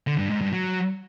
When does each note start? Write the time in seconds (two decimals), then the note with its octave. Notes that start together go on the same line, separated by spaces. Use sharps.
0.07 D3
0.18 G2
0.30 G#2
0.41 G2
0.53 F#3